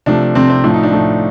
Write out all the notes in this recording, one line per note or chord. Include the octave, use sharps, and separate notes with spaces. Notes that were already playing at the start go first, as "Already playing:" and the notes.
C3 F3 A3 D4
C3 F3 A3 C4
C4
A2 F3 A3 D4
D#4
D4
A2 F3 A3